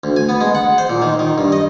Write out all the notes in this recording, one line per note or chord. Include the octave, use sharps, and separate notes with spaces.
D2
G#5
B3
G#3
F#5
C5
A#2
D#3
D#3
G2
D#5